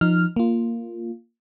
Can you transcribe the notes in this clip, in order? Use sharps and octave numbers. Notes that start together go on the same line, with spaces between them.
F3 D#4 F6
A#3 F4